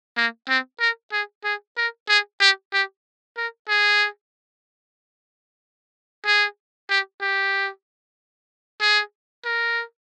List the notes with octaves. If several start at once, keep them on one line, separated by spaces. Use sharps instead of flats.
A#3
C4
A#4
G#4
G#4
A#4
G#4
G4
G4
A#4
G#4
G#4
G4
G4
G#4
A#4